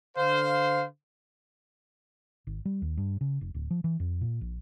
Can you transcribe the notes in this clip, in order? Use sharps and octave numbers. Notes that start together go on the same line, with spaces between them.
D3 C5 F5
G#1
G3
D#2
G2
C#3
F1
D1
F3
E3
F2
A#2
A#1